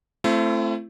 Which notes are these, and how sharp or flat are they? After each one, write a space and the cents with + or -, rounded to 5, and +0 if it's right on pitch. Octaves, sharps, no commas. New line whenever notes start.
A3 +0 C4 +0 E4 +45